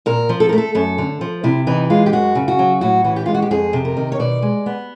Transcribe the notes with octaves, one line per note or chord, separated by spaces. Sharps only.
A#2 A#4
F3
A4
A#4
A3
A4
F#2 A4
D3
F3
C3 E4
E3 D#4
G#3 F4
G4
F#2 F#4
C#3
F#4
F#3
A2 F#4
E3 F#4
G4
G#3 F4
F#4
G4
F2 G#4
C3
A#4
D#3
C#5
B2 D5
G#3
B3